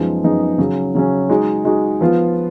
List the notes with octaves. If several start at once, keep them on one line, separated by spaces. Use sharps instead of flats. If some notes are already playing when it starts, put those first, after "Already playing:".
Already playing: F#2 F3 G#3 B3 D#4
F#2 F3 G#3 B3 D#4
C#3 F#3 C#4
C#3 F#3 C#4
G#3 D#4 F#4
G#3 D#4 F#4
F3 B3 F4